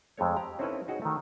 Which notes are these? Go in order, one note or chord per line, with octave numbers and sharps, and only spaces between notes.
F2 G#3 A3 C#5
G4 A#5
C4 C#4 D#4 E4 A4 B4
C#4 D#4 F#4 G#4 D#5
D#3 A3